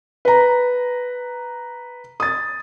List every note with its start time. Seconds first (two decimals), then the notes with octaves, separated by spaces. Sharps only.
0.25 B4 A#5
2.20 D#6 A6